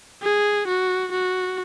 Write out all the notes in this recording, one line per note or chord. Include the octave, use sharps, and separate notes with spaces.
G#4
F#4
F#4